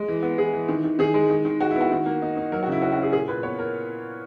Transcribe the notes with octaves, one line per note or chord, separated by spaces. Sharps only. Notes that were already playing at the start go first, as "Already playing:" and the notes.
Already playing: G#3
E3
B3
E3 G#4
E3
D#3
D#3
D#3 G#4
G#3
D#3
D#3
G#3 F#4
E4
B3
F#4
D#3
A#3
D#4
D#4
F#3 A#4
F#4
C#3 E4
C#4 F#4
F#4
C#4 G#4
A#2 G#4
A#2 B4
B3 C#5
A#4